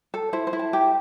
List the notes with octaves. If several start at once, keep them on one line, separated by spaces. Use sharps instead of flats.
A4
E4 C5
C5
E4
A5
G4